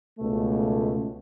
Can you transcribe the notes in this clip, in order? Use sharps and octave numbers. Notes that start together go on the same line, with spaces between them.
C#2 B2 A3